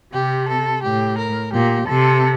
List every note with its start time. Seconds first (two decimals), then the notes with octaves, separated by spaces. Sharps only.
0.13 C3 G4
0.48 A4
0.83 A2 G4
1.18 A#4
1.53 A#2 G4
1.88 C3 A4